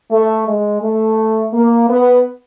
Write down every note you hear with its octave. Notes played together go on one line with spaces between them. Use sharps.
A3
G#3
A3
A#3
B3